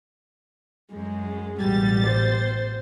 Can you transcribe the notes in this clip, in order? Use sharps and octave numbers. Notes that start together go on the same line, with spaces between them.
F#2 G#3
A1 B2 G3 A6
C5